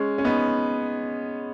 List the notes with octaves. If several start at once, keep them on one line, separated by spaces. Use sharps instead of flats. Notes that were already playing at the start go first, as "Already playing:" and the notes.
Already playing: G#3 C#4
C#4
B3 D#4